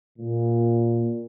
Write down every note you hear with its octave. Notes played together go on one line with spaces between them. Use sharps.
A#2